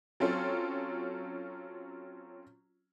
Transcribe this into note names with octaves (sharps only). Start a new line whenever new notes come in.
F#3 C4 C#4 F4 A4